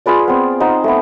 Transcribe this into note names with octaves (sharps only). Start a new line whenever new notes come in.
F4 G#4 B4 D5
B3 C4
D#4 C5 F#5
A3 B3